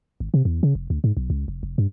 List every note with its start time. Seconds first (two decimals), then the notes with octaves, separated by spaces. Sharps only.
0.20 G#1
0.34 C3
0.45 E2
0.63 C#3
0.75 F1
0.90 D2
1.04 G#2
1.17 B1
1.30 C#2
1.48 F1
1.63 F1
1.78 G2